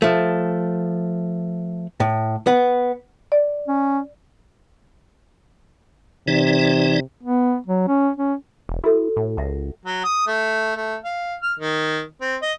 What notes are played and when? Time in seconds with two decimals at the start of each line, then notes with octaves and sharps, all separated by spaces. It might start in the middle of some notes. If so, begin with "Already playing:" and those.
0.02 F3 A3
2.00 A2
2.47 B3
3.32 D5
3.68 C#4
6.28 C3 E3 D#4 D5
7.23 B3
7.66 F#3
7.88 C#4
8.17 C#4
8.69 E1
8.84 E4 F#4 A4
9.16 A2
9.37 C#2 E5 F#5 A5
9.85 F#3
10.04 D#6
10.27 A3
10.76 A3
11.04 F5
11.42 F6
11.59 D#3
12.21 C4
12.42 D#5